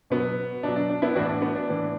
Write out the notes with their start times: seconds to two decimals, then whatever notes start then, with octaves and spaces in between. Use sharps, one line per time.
0.10 B2 F#3 B3
0.63 B2 F#3 D4
0.76 D4
0.89 D4
1.02 B3 E4
1.15 A2 E3 D4 F#4
1.28 D4
1.42 B3
1.55 D4
1.68 A2 E3